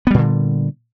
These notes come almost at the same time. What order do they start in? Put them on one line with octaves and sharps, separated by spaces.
B3 G3 A#2 D3